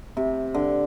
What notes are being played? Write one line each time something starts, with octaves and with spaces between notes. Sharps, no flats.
C3
D3